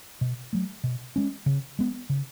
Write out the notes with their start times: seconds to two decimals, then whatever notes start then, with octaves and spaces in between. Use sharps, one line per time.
0.21 B2
0.53 F#3 A3
0.84 B2
1.16 G#3 C#4
1.46 C#3
1.79 G#3 B3
2.10 C#3